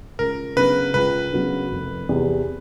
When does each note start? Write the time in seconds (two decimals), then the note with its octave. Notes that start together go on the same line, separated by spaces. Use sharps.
0.19 C#2 A#4
0.56 C#3 F#3 B3 D4 B4
0.94 C#2 B4
1.32 C#3 F#3 B3 D4
1.71 F1
2.09 E2 C3